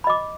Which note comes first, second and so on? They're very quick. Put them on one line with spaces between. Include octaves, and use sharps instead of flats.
B5 D#5 D6